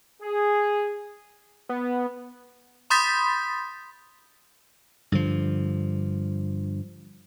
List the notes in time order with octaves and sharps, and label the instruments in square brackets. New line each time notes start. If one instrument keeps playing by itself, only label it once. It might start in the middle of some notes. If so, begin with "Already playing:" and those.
[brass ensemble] G#4
[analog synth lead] B3
[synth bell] B5 C6 D#6 G6 A6 B6
[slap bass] G2 D3 F3